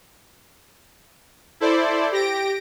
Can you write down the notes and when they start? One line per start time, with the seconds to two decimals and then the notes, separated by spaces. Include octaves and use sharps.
1.60 E4 A4 C5 D5
2.12 G4 A#6 D7